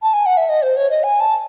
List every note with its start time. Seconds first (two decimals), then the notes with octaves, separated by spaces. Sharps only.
0.02 A5
0.13 G#5
0.26 F#5
0.37 E5
0.49 D#5
0.62 C5
0.77 C#5
0.90 D#5
1.04 G#5
1.20 A5